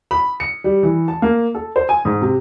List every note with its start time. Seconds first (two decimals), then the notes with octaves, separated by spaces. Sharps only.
0.11 B5
0.40 C#7
0.64 G3
0.83 E3
1.08 A5
1.22 A#3
1.55 A4
1.76 C5
1.89 G#5
2.05 G#2
2.22 C3